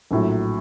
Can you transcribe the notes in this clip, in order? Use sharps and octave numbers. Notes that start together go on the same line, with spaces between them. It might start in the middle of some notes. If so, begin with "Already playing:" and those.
A#1 A2 F#3